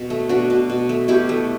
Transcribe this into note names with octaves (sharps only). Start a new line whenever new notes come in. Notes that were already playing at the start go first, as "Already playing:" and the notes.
Already playing: B2
A3
B2 D4 F#4
B2
B2
A3
B2 E4 G4
A3